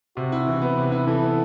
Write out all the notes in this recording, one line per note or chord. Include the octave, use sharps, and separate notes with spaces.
C3 F#4
E4
E3
B3 B4
C3
E4
E3 A4
B3